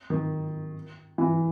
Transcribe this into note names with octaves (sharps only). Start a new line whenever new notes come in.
D#3
E3